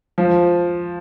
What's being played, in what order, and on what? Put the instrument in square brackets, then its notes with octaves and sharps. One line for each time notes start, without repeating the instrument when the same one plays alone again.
[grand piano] F3